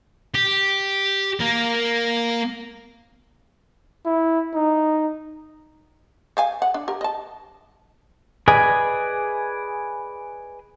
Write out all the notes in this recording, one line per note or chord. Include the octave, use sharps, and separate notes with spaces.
G4
A#3 A#4
E4
D#4
C5 F5 G#5
F#5
D4
G4 A#4
D#5 A5
G#4 B4 D5 D#5 G#5